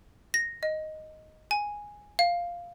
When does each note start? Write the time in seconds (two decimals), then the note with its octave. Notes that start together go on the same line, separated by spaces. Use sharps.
0.34 A#6
0.63 D#5
1.51 G#5
2.19 F5